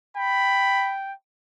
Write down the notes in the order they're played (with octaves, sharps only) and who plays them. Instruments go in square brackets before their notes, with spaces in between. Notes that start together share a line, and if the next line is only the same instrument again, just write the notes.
[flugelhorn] G5 [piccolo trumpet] B5